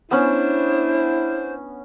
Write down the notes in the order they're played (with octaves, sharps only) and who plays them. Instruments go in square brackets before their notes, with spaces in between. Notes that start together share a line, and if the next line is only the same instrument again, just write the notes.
[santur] B3 C#4 [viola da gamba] D4 [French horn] E4 [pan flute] C5